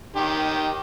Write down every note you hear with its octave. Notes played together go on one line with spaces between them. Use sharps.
D#3 G4